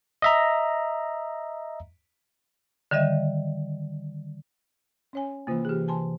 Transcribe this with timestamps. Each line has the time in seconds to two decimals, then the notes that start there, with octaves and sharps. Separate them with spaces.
0.22 D#5 E5 A#5
2.91 D3 D#3 G3 D#5 E5
5.13 C#4 C#5 G#5
5.47 C3 E3 A#3 F4 C5
5.65 G4 G#4
5.88 G#5 A5 C6